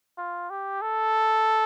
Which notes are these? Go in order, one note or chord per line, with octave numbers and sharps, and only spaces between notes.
F4
G4
A4